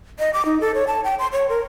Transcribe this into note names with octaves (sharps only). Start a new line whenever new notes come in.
D#5
D6
D#4
A4
C#5
A5
G5
C6
C#5
A#4